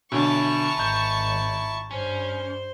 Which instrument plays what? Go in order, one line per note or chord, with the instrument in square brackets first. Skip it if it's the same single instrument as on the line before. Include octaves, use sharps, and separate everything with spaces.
[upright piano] B1 D3 [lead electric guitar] E4 G#5 [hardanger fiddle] A5 C#6
[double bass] G#1 [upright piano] A#5 G6
[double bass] G2 [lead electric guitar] C#4 [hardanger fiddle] C5